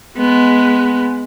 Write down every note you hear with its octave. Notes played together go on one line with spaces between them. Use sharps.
G#3 B3